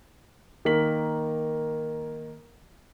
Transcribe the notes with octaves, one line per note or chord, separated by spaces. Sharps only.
D#3 A#3 A#4 B6 F#7